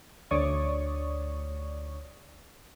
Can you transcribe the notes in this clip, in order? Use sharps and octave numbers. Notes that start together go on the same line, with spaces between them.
D2 C#5 D5 C#6 D#6